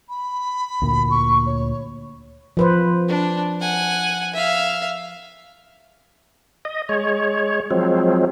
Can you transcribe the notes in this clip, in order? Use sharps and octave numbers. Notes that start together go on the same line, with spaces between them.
B5
D2 A#2
C#6
C#5
F3 B4 C5
D4
F#5 G#5
E5 F5
D#5
G#3 C#5
F3 F#3 G#3 C4